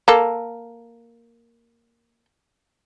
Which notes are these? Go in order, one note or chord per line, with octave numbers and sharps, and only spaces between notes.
A#3 A4